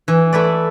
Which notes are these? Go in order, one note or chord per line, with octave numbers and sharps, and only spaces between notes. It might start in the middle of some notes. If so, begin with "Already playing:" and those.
E3
A3 E4 B4 D5